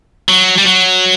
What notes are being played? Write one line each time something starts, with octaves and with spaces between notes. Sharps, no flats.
F#3
G3
F#3